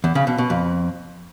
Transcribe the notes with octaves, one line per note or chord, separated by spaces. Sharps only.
E2
C#3
B2
B2
F2